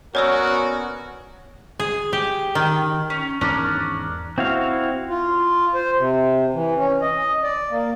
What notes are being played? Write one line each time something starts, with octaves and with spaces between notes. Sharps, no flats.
B3 C#4 F#4 A#4 C#5 D5 E6
G#4
G4
D#3
C#4
E2 G#2 D#3 C#4 D4 A#4 D5
C4 E4 F#4 F5
F4
C5
C3
E3
C#4
D#5
D5
A#3